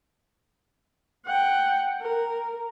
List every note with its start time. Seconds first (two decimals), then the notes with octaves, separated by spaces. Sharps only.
1.26 F#5 G5
2.01 A#4